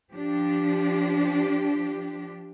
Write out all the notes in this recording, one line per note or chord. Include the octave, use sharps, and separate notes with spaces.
F3 D4 G4